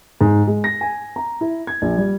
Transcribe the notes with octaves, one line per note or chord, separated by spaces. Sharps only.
G#2
G#3
A#6
G#5
A#5
E4
G#6
A#1
G3